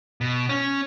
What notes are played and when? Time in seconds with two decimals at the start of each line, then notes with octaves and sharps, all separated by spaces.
0.21 B2
0.49 C#4